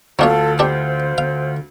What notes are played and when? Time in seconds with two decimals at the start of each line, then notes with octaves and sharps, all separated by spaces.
0.19 D2 D3 F#3 D4 F4 A4 C#5
0.59 D4 G4 C5
1.18 D3 F5